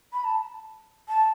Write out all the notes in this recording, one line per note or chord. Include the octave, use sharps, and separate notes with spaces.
B5
A5
A5